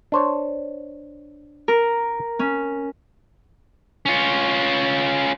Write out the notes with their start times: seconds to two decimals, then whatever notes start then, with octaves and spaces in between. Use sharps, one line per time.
0.12 D4 C5 C#5
1.68 A#4
2.39 C#4
4.06 C#4 F4